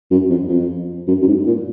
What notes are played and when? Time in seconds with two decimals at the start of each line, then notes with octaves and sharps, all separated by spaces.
0.11 F#2
0.30 F2
0.49 F2
1.08 F#2
1.22 F#2
1.27 G#2
1.46 A#2